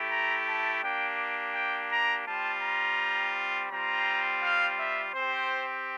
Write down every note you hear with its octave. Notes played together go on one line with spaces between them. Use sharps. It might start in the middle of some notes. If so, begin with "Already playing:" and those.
Already playing: A3 E4 G4
A#5
A5
A#3 D4 G4 G5
G5
A#5
G3 C4 F4 A5
A#5
G3 C4 F4 A#5
F5
E5
C4 G4 C5